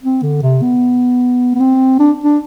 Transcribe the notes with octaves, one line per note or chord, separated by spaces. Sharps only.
C4
D3
C3
B3
B3
C4
D4
D4